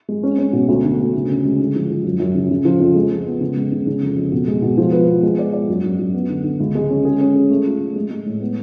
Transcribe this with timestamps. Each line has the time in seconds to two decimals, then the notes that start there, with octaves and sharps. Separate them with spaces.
0.08 G#3
0.23 C#4
0.38 C#4
0.53 B2
0.68 D2
0.84 D3
0.99 D2
1.15 C#3
1.29 C#4
1.44 G#3
1.59 D3
1.75 F3
1.90 F3
2.04 F#2
2.20 F#2
2.35 C#3
2.50 C#3
2.65 F3
2.80 F2
2.96 G#3
3.10 G#3
3.26 B3
3.41 C#3
3.56 G#3
3.72 C#3
3.87 C#3
4.01 F2
4.16 F2
4.32 B2
4.48 G#3
4.62 B2
4.77 F3
4.92 B4
5.08 B3
5.23 G#3
5.38 D5
5.53 D5
5.68 F#2
5.84 F#2
5.99 F#2
6.14 B3
6.29 D3
6.44 D3
6.60 C#2
6.75 G#3
6.90 C#4
7.05 G#4
7.20 C#4
7.35 G#4
7.50 A3
7.66 F4
7.81 A3
7.96 G#3
8.10 G#3
8.26 A2
8.41 B3